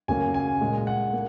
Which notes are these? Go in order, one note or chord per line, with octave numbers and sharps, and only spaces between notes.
F#2 C#3 F#3 A#3 G#5
G#5
A#2 G#3
F#5
A#3